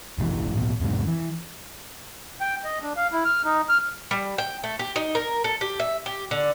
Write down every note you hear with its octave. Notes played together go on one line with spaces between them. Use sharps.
F#1 B1 A2 E3
A1 B2
E2 G#2 C3
E3
G5
D#5
D4
F5
E4
F6
D#4
F6
G3
G5
A3
G4
D#4
A#4
A4
G4
E5
G4
D3